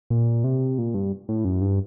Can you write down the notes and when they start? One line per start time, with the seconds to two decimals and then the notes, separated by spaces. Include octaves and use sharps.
0.10 A#2
0.44 C3
0.78 A#2
0.94 G2
1.29 A2
1.45 F#2
1.62 G2